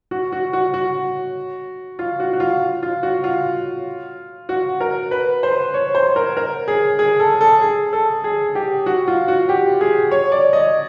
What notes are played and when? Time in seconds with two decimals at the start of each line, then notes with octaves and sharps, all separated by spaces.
0.11 F#4
0.32 F#4
0.53 F#4
0.74 F#4
1.99 F4
2.20 F#4
2.33 F#4
2.40 F4
2.83 F4
3.03 F#4
3.24 F4
4.49 F#4
4.80 A#4
5.11 B4
5.43 C5
5.74 C#5
5.95 C5
6.16 A#4
6.37 A#4
6.68 G#4
6.99 G#4
7.20 A4
7.41 A4
7.61 G#4
7.93 A4
8.24 G#4
8.55 G4
8.86 F#4
9.08 F4
9.28 F#4
9.49 G4
9.81 G#4
10.11 C#5
10.32 D5
10.53 D#5